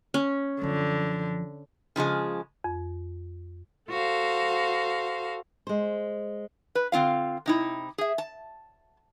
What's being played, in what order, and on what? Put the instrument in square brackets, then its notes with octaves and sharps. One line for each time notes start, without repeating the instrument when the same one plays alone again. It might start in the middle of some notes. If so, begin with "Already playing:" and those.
[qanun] C#4
[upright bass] F#2 F3 [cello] D3
[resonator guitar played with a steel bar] C#3 F3 F#3 G#3
[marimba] F2
[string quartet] F#4 A4 C5 F5
[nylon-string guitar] G#3 C5
[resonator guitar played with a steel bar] B4
D3 C4 F4 F5
C3 D#4 E4
G#4 E5
A5